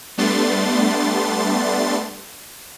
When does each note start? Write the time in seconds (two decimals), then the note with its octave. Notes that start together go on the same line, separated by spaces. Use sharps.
0.18 G3 A3 B3 D4 C6 A6